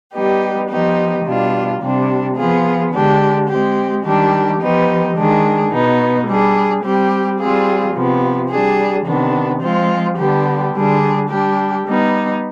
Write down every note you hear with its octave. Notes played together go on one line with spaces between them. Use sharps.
G3 B3 D#4 G4
F3 B3 D#4 G4
B2 G3 D4 F4
C3 G3 D4
F3 B3 F4 G#4
D3 G#3 D4 G4
G#3 C4 G4
D#3 G3 D4 G4
F3 B3 D#4 G4
D#3 G#3 D4 G#4
B2 B3 D#4
G3 D4 G#4
G3 C4 G4
G3 C4 F4 G#4
C3 F3 B3
G3 D4 G#4
C3 D#3 B3 D4
F3 G#3 C4 F4
D3 G3 B3 D4 G4
D3 G3 D4 G#4
G3 D4 G4
G3 B3 D#4